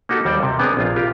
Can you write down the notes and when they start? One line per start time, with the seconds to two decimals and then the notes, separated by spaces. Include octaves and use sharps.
0.09 A#3 D#4 F#4 G4 A4
0.25 D#2 G3 C5 D5 G5
0.43 C3
0.59 B3 C4 D4 G#4 A#4
0.77 A#1 F4
0.96 F4 G4 A#4